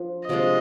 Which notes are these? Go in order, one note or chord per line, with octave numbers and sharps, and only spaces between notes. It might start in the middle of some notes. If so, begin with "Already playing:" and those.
Already playing: F3 D4
C3 F3 G#3 D4 D#5